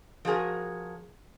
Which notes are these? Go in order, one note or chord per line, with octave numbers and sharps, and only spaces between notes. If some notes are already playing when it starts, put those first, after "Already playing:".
F3 F#4 G#4 A#4